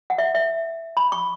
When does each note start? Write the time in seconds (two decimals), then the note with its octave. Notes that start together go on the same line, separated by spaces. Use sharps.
0.10 F#5
0.18 E5
0.35 E5
0.97 B5
1.12 C#6